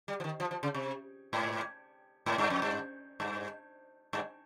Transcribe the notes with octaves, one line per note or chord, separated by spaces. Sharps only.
G3
F3
D#3
F3
F3
C#3
C3
G#2
G#2
G2
F2
G2
G2
G2